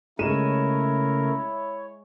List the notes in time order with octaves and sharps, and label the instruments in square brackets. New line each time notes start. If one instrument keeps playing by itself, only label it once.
[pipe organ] C#3 A3 A#4 [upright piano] G#3 D#7 E7 [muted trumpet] E4 [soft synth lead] C#5